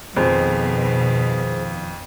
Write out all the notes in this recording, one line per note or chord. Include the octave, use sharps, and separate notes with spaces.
F2 B2 D#3 F3 G#4 C5